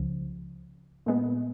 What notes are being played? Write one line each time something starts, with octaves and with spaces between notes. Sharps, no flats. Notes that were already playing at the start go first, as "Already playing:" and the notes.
Already playing: C#2 C#3 F3
A#2 G#3 B3